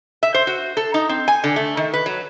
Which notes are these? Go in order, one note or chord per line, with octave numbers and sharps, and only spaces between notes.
E5
C5
F#4
A4
D#4
C4
G#5
D3
A3
D#3
B4
F#3